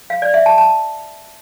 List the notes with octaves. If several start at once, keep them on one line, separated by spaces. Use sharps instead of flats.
F5
D5
E5
A5
A5